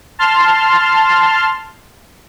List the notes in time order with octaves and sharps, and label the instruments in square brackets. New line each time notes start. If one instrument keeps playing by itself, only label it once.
[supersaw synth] A5 C6 F6